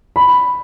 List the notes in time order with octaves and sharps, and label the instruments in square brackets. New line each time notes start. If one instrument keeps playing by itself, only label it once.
[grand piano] B5